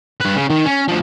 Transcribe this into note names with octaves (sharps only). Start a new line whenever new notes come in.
G2 B4
C#3
D#3
C#4
D2 F3